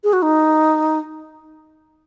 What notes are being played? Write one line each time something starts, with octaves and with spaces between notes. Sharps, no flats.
G#4
F#4
D#4